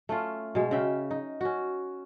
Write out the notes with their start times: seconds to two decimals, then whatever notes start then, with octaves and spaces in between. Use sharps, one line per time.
0.09 A3 C#4 F4
0.55 B2 G#3
0.71 C#3 C#4 E5 G5
1.11 D#4
1.41 C#4 F#4